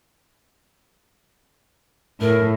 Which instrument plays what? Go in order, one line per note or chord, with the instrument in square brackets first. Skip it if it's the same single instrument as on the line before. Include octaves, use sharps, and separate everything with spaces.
[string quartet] A2 [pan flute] A#4